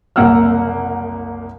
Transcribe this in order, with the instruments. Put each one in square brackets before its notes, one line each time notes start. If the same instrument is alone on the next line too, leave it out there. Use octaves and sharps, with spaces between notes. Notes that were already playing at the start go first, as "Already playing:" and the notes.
[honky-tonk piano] F#1 C2 A#3 F#5 E6 F6